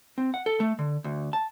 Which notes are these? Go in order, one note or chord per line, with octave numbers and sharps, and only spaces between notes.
C4
F#5
A4
A3
D3
D2
A5